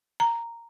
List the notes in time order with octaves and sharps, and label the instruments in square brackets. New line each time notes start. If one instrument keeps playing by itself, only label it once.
[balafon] A#5